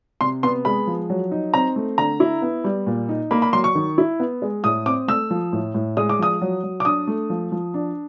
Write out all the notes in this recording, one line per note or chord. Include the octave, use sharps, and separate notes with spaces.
C3 C6
B3 C6
G#3 B5
F3
F#3
D#4
C4 A#5
A3
D3 A#5
E4
B3
G3
A#2
D#4
A#3 B5
B5
F#3 C6
C#6
D#3
E4
B3
G#3
A2 D#6
C4 D6
A3 E6
F3
A2
A2
G#3 D#6
D6
F3 D#6
F#3
F#3
D6
D4 D#6
A3
F3
F3
D4